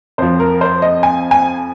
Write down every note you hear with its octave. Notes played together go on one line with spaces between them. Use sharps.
F2 F3 C5
A#4
C5
D#5
G#5
G#5